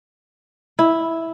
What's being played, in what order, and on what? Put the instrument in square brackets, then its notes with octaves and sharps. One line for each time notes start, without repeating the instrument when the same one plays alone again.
[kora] E4